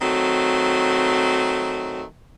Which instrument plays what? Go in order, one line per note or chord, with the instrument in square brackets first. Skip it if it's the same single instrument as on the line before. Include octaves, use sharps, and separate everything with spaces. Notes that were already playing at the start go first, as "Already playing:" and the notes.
[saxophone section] D#3 F#3 A3 C4